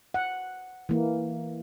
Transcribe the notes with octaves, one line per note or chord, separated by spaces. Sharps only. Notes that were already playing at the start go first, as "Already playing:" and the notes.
F#5
E3 A#3